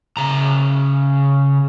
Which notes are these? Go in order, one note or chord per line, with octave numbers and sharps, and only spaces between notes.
C#3 A#5